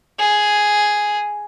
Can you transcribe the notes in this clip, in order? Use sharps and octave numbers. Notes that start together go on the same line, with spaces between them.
G#4